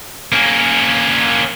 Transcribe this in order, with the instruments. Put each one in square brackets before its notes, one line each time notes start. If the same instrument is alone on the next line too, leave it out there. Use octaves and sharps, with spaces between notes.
[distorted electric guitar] A#3 C#4